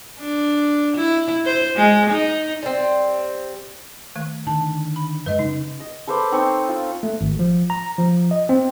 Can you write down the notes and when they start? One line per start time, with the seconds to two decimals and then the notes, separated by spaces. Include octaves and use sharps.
0.19 D4
0.96 E4
1.46 C5
1.77 G#3
2.10 D#4
2.63 G3 C4
4.16 D#3 A3
4.47 D3 D#3 A5
4.96 B5
5.26 F#2 G#3 B4 D#5
5.39 C#3 D#4
5.80 D#5
6.08 A4 B4 C5 D6
6.32 C4 D#4 C#5
6.68 F4
7.03 A3
7.21 G#1
7.39 F3
7.70 A#5
7.98 F3
8.31 D#5
8.49 C4